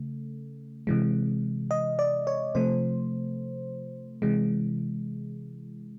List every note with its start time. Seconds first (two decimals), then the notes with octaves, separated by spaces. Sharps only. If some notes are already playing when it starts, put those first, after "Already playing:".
Already playing: C#3 A3
0.87 C3 E3 G#3
1.71 D#5
1.99 D5
2.27 C#5
2.55 C3 F3 A3 C5
4.22 C3 E3 G#3